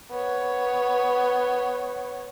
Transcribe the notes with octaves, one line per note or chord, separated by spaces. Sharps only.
B3 C#5